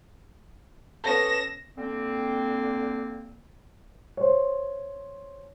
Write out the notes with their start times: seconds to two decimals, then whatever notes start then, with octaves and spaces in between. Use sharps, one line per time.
1.04 B3 C#4 A4 A#6 E7
1.78 D3 A#3 C4
4.17 C5 C#5